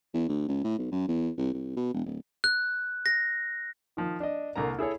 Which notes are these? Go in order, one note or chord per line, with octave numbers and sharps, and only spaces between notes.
E2
D2
C#2
A2
B1
F#2
E2
C2
C2
B2
E1
D1
F#6
A#6
D#3 F3
D4 D#5
C2 D3 A#3 A#5
E4 G#4 A4 C#5